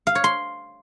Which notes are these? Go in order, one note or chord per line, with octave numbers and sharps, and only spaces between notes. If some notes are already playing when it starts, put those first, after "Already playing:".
F5
C#5
C6